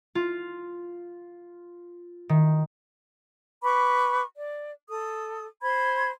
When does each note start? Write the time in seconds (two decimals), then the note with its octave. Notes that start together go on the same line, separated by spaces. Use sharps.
0.15 F4
2.29 D#3
3.63 B4 B5 C#6 D6
4.35 D5
4.88 A4 D#6
5.62 C5 B5 C6 G#6